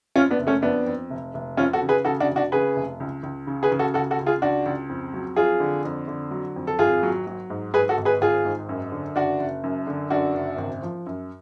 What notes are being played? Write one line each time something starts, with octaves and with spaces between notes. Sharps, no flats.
F2 C#4 F4
B3 D4
F#1
A3 C#4
F2 B3 D4
F2
F1
F1
F2 C#4 F4
F#4 A4
C#3
G#4 B4
C#3 F#4 A4
D4 F#4
F1
D4 F#4
C#3 G#4 B4
F1
C#2
C#2
C#3
G#4 B4
C#3
F#4 A4
C#2 F#4 A4
F#4 A4
C#2
F4 G#4
C#2 D4 F#4
C#2
F2
F#3
F2 F4 G#4
D3
F2
D3
F#3
F2
A4
G#1 F4 G#4
F#3
F#3
G#2
G#2 G#4 B4
F#4 A4
G#1
G#4 B4
G#1 F4 G#4
G#2
F#2
D3
F#1 D4 F#4
F#1
F#2
D3
F#2 D4 F#4
F#1
G#1
F3
F#2